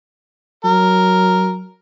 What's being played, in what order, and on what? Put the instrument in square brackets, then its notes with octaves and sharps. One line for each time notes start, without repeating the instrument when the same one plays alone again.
[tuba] F#3 [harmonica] A#4